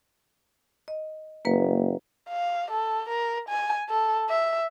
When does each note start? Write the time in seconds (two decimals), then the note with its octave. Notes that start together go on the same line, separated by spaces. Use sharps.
0.88 D#5
1.45 F#1 A#3 B4
2.29 F5
2.71 A4
3.09 A#4
3.49 G#5
3.89 A4
4.29 E5